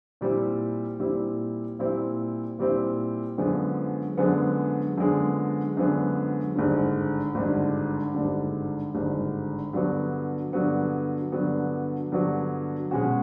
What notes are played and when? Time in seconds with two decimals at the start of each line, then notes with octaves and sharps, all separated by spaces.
0.21 A#2 G3 C4 E4
1.00 A#2 G3 C4 E4
1.79 A#2 G3 C4 E4
2.59 A#2 G3 C4 E4
3.38 F#2 D3 F3 G#3 B3
4.17 F#2 D3 F3 G#3 B3
4.98 F#2 D3 F3 G#3 B3
5.77 F#2 D3 F3 G#3 B3
6.56 G#1 G2 D3
7.35 G#1 G2 D3
8.15 G#1 G2 D3
8.95 G#1 G2 D3
9.73 G2 D3 F#3 B3
10.53 G2 D3 F#3 B3
11.32 G2 D3 F#3 B3
12.12 G2 D3 F#3 B3
12.91 B2 G#3 C#4 F#4